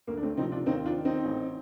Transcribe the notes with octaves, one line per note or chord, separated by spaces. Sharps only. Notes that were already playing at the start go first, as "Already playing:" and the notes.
D2 A#3
D4
A3 C4
C3 F3 C4 D#4
D4 F4
D#2 C4 D#4
D4 F4
D#3
C4 D#4
A1